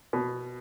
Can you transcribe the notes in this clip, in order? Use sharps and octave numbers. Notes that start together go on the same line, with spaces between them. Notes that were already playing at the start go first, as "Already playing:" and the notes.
B2